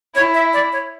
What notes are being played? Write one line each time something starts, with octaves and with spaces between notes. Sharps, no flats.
E4 C#5
E5
D5
C#5